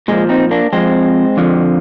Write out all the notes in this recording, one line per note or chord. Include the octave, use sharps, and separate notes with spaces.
A#2 F3 G#3
C4 D#4
A#3 D4
F2 D3 F3 G#3 C4
F2 D3 F3